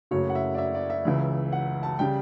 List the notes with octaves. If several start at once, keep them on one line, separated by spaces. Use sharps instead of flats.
F#1 F#2 C#3 F#3 A3 C#5
F#5
E5
D5
E5
D5
E5
C#2 C#3 E3
F#5
A5
C#3 G3 G5